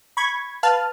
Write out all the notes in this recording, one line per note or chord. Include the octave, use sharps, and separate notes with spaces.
B5 C#6 G#6
B4 F5 A5 F6